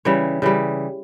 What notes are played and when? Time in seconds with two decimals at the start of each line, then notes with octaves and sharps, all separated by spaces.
0.05 C#3 E3 G3 C#5
0.42 C#3 E3 G3